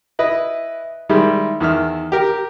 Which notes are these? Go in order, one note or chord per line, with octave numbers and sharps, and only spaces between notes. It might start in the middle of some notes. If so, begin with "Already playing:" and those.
E4 B4 D#5
D#3 G3 G#3 E4
E2 D#3 E5 F6
G4 A#4